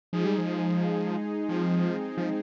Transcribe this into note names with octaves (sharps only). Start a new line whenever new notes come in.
F3 G#3 D#4 G#4
G3
F3
F3 G#3 C4 D#4 G#4
F3